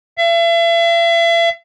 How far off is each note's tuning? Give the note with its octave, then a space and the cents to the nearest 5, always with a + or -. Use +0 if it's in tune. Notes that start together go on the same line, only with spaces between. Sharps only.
E5 +40